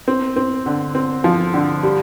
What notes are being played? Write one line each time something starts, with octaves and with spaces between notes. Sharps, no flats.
C4
C4
D3
C4
F3
D3
G3